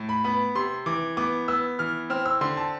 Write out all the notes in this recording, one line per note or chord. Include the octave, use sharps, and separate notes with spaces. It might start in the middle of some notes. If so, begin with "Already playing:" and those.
Already playing: A2
B5
B3 B5
C3 C6
E3 D6
B3 D6
B3 E6
E3 F6
C4 F6
E6
D3 C6
A5